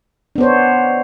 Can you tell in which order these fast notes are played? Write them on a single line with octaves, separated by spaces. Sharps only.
D4 B3 C5 C#5